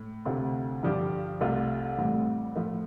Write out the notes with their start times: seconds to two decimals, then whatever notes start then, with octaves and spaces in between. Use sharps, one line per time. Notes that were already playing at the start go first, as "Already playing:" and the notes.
Already playing: A2
0.25 D2 C3 A3 C4 F4
0.83 G2 D3 F3 D4 G4
1.41 C2 C3 A3 F4
1.98 A1 A2 G3 C4
2.56 A2 F3 A3